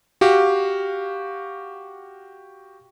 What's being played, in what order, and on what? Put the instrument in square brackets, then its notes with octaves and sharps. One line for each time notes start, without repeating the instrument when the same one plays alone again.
[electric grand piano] F#4 G4 F5